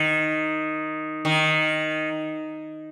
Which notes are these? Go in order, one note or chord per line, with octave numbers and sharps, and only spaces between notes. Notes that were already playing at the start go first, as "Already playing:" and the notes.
Already playing: D#3
D#3